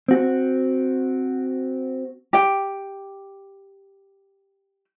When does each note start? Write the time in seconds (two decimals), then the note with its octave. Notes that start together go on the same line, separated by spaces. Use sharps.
0.08 C4 F#4
2.33 G4 G5